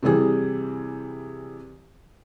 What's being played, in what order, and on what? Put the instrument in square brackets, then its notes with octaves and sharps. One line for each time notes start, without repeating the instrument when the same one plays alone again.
[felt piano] C3 E3 G3 G#4